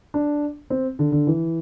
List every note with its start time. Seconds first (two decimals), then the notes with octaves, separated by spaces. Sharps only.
0.14 D4
0.70 C4
0.99 D3
1.12 D3
1.27 E3